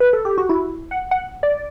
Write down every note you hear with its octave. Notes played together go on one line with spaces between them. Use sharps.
B4
A4
G4
F#4
E4
F#5
F#5
D5